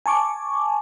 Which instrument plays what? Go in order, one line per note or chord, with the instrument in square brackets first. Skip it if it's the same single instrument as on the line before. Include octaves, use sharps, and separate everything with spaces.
[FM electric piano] G#5 A5 C#6 D6